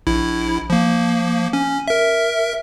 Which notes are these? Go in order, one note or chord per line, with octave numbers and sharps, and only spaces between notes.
A#1 E4
F3 A#3
C#4
A#4 E5